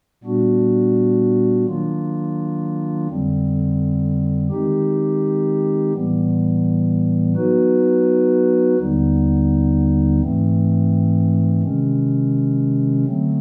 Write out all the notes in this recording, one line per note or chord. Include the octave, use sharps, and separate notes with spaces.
A#2 G3 B3 D4 F#4
D#3 F#3 A#3 D4 F4
F2 D3 G3 C4
D#3 G#3 C4 D#4 G4
A2 E3 G3 B3
F#3 B3 D#4 F#4 B4
D#2 D3 G3 B3 D#4
G#2 E3 A3 C4
C3 D#3 G#3 C#4
D3 F#3 A3 C4